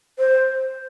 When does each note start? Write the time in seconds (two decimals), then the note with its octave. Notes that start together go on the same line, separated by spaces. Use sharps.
0.19 C5